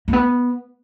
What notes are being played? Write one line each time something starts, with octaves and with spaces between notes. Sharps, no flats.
A#3
B3